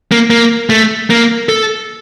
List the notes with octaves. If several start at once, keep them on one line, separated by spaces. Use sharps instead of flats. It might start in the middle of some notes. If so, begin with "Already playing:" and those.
A#3
A#3
A3
A#3
A4